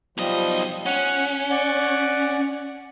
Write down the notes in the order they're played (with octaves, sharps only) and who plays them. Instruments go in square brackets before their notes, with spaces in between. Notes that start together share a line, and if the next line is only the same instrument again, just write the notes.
[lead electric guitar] B1 D#5 [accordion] F3 G3
[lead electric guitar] C#4 [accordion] F#5
[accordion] D5 F#5